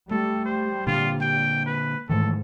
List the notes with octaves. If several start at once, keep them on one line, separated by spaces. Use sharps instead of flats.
G3 A3 A4
C5
A#2 D3 A#3 F4
G5
B4
G#2 D#3 E3 A3 A4